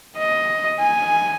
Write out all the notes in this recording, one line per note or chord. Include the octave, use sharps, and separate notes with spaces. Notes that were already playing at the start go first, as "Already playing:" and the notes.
D#5
G#5